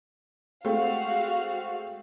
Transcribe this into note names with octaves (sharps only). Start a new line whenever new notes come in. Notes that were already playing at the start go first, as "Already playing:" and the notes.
G#3 A3 C4 F#4 F5